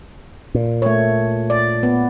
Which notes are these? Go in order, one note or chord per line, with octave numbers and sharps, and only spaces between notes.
A#2
A3 C#5
D5
B3